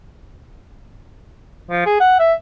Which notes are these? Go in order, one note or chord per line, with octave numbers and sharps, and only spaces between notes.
F3
G#4
F#5
E5